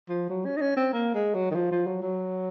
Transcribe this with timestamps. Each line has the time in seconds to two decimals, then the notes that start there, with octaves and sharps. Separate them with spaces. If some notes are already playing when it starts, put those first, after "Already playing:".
0.09 F3
0.30 F#3
0.45 C#4
0.57 D#4
0.61 C#4
0.76 C4
0.93 A#3
1.14 G#3
1.34 F#3
1.51 D#3
1.55 F3
1.71 F3
1.86 F#3
2.02 F#3